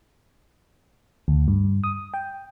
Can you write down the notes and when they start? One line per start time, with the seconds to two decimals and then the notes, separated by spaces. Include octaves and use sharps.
1.28 D2
1.48 G2
1.84 D#6
2.14 G5